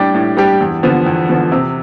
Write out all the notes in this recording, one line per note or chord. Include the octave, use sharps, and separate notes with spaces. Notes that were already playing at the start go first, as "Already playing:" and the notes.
Already playing: A2 G3 D4 G4
A2
G3 D4 G4
E2
D3 F3 B3
E2
D3 F3 B3
C3